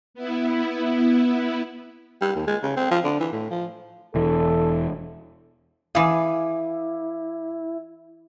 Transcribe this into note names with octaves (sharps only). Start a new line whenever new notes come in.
B3 E4
G3
D#2
G#3
C#3
C4
F3
D3
E3
A2
F3
E1 E3 A4
E3 E4 G#4 F5 D6